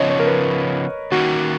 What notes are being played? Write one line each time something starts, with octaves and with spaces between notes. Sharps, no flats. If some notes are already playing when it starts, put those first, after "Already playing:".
Already playing: C#3 F3 B3 C#5 D#5
C#5
A#4
B4
D#3 A#3 C#4 F#4